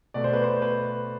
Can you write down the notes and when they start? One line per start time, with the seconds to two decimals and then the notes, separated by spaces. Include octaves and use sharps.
0.14 B2 A3 D5
0.24 C5
0.33 B4
0.44 C5
0.62 B4